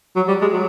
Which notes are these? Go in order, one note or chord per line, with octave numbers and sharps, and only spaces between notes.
F#3
G3
G#3
F#3